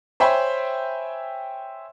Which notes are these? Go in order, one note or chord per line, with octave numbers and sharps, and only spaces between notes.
C5 C#5 E5 G5 G#5 B5